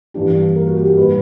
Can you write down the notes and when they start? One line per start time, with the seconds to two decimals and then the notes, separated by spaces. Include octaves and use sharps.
0.14 G2 E3 A#3 D4 G4
0.56 A#4
0.67 F#4
0.77 G4
0.87 G4
0.97 A#2 G3 A#3 B4